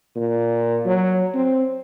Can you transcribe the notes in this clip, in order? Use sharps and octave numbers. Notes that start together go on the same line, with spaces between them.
A#2
F#3
C4